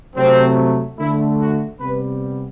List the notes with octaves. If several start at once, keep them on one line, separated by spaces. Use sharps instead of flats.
C3 F#3 A3 C4
D3 A3 E4
F#4
C3 G3 B3 B4